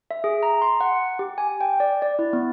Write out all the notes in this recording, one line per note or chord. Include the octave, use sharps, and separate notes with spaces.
E5
G#4
A#5
C6
F#5
G4
G#5
G5
D5
D5
E4
B3